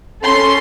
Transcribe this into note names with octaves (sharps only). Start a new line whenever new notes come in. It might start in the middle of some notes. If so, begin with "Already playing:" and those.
C#4 A4 C6